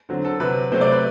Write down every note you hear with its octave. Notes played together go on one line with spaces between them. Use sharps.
D3 F#3 C4
A4
C3 F#3 C4 B4
C3 F#3 A3 C4 C5
D5
B4